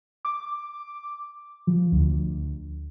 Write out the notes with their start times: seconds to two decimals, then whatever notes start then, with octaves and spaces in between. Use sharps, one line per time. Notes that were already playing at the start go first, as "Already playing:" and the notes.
0.25 D6
1.67 F3
1.92 D2